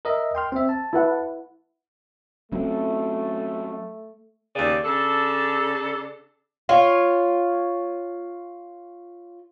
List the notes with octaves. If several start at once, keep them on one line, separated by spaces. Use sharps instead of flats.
A#4 D#5 E5
G5 C6 F6
C4 E5
A5
E4 B4 F#5
F#3 A3 C4 C#4
D#2 C#3 D5
C#3 D4 A4
F4 C#5